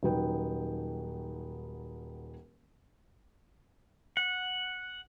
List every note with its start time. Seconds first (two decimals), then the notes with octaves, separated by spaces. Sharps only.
0.03 D#1 F#3 D#4 B4 G5
4.17 F#5